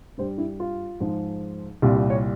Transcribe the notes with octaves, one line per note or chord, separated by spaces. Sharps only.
G2 G3 C5
E4
F4
G#2 F3 G#3
C2 A#2 G3 F4
F4
C#5